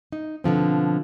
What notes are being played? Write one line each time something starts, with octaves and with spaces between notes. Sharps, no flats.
D#4
B2 D3 F3 C4